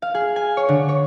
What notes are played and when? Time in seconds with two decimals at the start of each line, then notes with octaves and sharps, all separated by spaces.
0.02 F5
0.14 G#4
0.36 G#5
0.57 C#5
0.69 D3
0.89 C#5